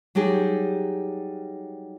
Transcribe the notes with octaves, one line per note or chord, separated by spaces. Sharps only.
F#3 G3 D#4 G4 G#4